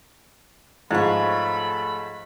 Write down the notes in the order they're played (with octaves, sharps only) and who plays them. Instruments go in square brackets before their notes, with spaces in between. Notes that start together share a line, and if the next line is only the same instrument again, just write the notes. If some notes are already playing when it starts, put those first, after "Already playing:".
[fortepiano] G#2 [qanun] F3 C#5 [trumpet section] A3 B5